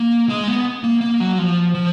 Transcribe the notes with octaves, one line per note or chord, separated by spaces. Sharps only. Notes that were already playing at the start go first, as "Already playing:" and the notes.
Already playing: A#3
G#3
B3
A#3
A#3
F#3
F3
F3